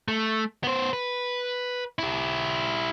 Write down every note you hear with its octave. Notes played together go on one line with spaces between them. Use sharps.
A3
B3 C5
B4
E4 G4